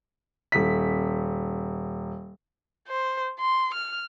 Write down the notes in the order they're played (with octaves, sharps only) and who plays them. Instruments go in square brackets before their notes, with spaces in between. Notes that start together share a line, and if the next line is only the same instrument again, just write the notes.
[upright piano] D#1 B6
[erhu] C5
C6
F6